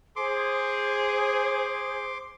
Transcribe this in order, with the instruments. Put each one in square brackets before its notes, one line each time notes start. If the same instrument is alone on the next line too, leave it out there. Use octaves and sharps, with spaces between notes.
[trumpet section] G#4 [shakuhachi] C5 [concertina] C6 D6